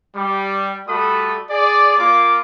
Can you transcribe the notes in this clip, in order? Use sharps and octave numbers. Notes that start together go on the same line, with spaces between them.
G3
G3 A3 F#4 A4 B5 D#6
G#4 D5
A#3 F4 D6